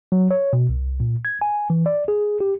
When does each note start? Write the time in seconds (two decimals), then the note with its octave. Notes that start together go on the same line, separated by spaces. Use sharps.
0.12 F#3
0.31 C#5
0.53 B2
0.69 C2
1.00 A#2
1.25 G#6
1.41 G#5
1.70 E3
1.86 D5
2.08 G#4
2.40 G4